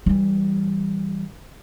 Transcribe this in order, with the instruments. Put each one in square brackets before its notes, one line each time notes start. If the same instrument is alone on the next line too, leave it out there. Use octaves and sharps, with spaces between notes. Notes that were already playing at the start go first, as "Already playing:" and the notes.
[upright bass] E3 G3